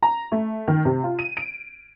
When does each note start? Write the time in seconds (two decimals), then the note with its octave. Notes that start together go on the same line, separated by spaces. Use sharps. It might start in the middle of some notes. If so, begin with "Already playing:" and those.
0.02 A#5
0.32 A3
0.68 D#3
0.85 C3
1.04 F4
1.19 D#7
1.37 D7